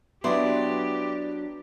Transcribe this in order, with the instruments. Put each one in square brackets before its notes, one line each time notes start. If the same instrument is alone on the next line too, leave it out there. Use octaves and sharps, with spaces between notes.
[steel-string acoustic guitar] F#3 D4 [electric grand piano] B3 B4 [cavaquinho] E4 D5 C6 [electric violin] G4